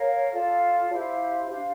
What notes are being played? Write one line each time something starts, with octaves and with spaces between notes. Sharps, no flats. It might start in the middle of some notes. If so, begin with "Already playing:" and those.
Already playing: A#4 C#5 F5
F4 A4 D5 F5
E4 G4 C5 F5
D4 G4 C5 F5